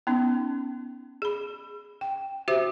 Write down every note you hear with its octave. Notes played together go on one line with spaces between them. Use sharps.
B3 C#4 D#4
G#4 B5
G5
F#4 G4 C5 E5